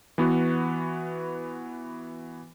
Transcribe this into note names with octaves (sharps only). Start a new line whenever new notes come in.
E3 B3 F#4